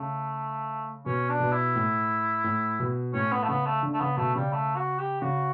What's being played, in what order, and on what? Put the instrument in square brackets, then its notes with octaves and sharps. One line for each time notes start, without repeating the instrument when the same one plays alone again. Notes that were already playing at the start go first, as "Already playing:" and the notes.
Already playing: [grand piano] C#3 [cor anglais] A3
[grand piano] B2 [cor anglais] C#4
[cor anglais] D4
[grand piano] B2
[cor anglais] E4
[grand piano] A2
A2
B2
[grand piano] A2 [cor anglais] C#4
[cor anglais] B3
A3
[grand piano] C#3 [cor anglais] B3
[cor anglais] A3
[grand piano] D3
[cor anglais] A3
[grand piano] C#3 [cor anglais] B3
[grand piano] B2 [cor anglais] A3
[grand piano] C#3 [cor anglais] G3
[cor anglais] A3
F#4
G4
[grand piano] C#3 [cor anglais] F#4